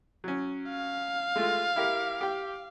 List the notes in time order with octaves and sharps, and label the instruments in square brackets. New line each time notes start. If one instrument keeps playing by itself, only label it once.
[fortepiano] F#3 C#4
[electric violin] F5
[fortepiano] G#3 A3 F4
E4 G4 A#4
G4 G5